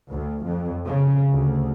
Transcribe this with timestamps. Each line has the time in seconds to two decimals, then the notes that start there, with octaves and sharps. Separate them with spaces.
0.10 D2
0.44 F2
0.86 C#3
1.33 D2